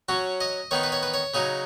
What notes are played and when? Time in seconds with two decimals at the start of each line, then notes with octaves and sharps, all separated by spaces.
0.09 F#3 C#4 F#4
0.40 D#5
0.71 D#3 B3 D#4 C#5
0.83 B4
0.92 C#5
1.03 B4
1.14 C#5
1.34 C#3 F#3 D#4 G#4